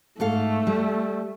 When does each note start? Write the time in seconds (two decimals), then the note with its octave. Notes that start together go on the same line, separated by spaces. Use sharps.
0.20 G#2 A3 A4 F5
0.67 G3